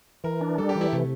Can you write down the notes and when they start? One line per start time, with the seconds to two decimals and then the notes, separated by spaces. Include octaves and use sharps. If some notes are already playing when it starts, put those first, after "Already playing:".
0.24 E3 A#4
0.41 D4
0.58 G3 A4
0.69 G4
0.75 E3
0.81 E4
0.93 C3 A3